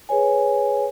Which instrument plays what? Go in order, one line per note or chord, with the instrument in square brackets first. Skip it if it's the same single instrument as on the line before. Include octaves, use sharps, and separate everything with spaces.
[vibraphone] G#4 B4 C#5 G#5